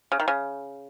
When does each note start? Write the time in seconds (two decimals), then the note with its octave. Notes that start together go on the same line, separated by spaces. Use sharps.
0.12 C#3
0.20 D#3
0.28 C#3